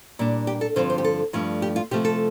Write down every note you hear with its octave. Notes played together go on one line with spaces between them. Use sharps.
A#2 G3 D4
G4
A4
G2 D3 F3 C4 C5
C5
G4
A4
G2 F3 A3 D4
G4
F4
C3 F3 A3 G4
A4